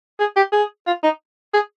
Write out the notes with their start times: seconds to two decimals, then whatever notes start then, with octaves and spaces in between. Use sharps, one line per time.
0.19 G#4
0.36 G4
0.52 G#4
0.87 F4
1.04 D#4
1.54 G#4